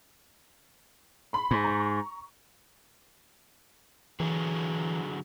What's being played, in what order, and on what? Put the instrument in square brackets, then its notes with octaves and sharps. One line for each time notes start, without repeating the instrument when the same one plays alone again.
[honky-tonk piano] B5 C6
[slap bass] G#2
[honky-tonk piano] A#5 C#6
[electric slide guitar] D3 F#3 G#4 [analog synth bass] E3